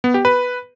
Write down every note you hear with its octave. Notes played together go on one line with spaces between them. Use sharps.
B3
G4
B4